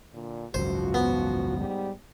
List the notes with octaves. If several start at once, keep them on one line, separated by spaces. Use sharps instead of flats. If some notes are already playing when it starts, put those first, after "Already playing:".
A#2 D3
G#1 C#2 F#2 F3 F#4 C5
B3
G#2 G3